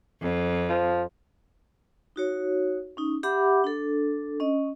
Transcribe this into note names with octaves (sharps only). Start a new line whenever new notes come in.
F2
F3
D#4 F#4 C#5
C#4 D#4
G4 E5 F#5 B5 D6
D4 A4
C#4 D#5